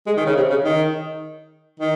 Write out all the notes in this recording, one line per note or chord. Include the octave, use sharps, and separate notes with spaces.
G#3
D#3
C#3
C3
C#3
D#3
D#3